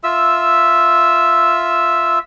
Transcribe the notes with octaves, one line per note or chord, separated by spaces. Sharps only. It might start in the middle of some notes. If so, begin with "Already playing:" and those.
F4 E5 E6